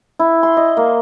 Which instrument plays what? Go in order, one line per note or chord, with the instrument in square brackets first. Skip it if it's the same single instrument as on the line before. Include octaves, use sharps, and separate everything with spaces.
[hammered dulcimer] E4
C6
D#5
A#3